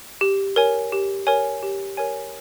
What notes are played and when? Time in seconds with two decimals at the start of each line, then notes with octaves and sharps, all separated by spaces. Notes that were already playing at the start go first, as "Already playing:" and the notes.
0.21 G4
0.56 A#4 C#5 G#5
0.92 G4
1.27 A#4 C#5 G#5
1.63 G4
1.97 A#4 C#5 G#5